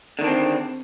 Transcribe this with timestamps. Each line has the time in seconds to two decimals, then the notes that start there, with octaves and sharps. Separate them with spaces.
0.19 D3
0.21 D#3
0.24 D4
0.27 C4